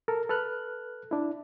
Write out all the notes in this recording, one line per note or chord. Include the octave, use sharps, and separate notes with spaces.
A4 A#4
A4 B4 F6 F#6
D4 E4